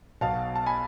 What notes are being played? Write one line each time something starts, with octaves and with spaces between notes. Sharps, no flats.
B1 B2 F5 A5
A5
G#5 B5